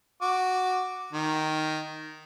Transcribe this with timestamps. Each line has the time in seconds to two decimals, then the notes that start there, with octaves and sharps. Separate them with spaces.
0.22 F#4 D6
1.13 D#3